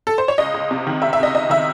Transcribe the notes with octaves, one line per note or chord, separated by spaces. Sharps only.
A4
C5
C#5
C#2 D#5
C#2
C3
D#3
C#2 E5
E5
C#2 D#5
C3 D#5
D#3 E5